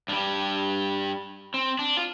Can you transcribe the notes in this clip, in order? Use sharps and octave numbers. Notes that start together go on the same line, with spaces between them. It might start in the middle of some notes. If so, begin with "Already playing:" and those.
G2 G3 D4
C4
D4
F4